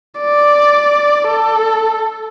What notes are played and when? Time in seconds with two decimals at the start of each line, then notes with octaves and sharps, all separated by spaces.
0.20 D5
1.29 A4